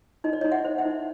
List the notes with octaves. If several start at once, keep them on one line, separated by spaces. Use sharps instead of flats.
D#4 D#5
D5
D#4 C#5 D#5
E5 F#5
C5
E5 F#5
D#4